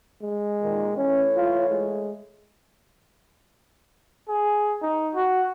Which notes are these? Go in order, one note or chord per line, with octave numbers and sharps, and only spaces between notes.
G#3
A#2 D#3
E3 A3 C#4 C#5
F4
G#3
G#4
D#4
F#4